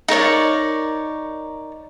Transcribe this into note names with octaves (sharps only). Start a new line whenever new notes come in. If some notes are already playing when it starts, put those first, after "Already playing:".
D#4 A#4 C#5 D5